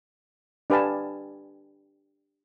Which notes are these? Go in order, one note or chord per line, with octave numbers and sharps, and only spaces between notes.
D4 G4 B4 F5 G#5 A5